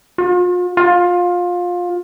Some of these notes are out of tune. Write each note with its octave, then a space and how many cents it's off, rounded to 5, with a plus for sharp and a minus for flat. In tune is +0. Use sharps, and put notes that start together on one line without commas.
F4 +40
F4 +20